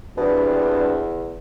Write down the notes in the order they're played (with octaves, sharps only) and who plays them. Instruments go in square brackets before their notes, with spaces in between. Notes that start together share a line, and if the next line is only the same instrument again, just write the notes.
[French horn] E2 [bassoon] B2 [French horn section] G3 C4 D4